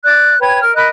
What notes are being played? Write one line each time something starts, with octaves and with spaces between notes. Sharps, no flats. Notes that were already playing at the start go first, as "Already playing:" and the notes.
D5 F#6
B4 C#5 G5 G#6
A#4 F6
A#4 D#5 B5 F#6